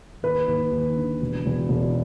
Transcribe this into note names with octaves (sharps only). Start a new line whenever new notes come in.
D#2 B4
D#2
D#2
D3
E1
E1
E1